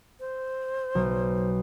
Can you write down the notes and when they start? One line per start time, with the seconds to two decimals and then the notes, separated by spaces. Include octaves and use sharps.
0.20 C5
0.95 B1